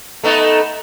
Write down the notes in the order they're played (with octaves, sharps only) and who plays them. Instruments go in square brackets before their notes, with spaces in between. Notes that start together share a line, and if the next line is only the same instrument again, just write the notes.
[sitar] A3 B3 D#4